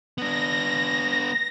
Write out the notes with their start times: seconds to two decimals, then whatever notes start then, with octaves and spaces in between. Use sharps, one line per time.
0.18 B3 D4 A#6